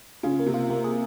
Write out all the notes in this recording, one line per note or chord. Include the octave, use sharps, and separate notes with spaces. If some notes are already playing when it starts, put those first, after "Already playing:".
C#3 F4
A#3
C3
F4
A#3
G#4